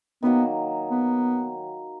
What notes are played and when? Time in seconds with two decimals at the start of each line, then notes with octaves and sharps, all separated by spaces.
0.23 D#3 F#3 A#3 B3 D#4
0.90 B3